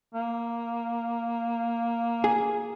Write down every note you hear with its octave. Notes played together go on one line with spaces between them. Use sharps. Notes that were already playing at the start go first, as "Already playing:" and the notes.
A#3
G#4